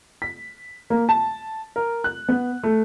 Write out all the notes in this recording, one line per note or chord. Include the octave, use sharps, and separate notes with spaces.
B6
A#3
A5
A#4
F#6
B3
A3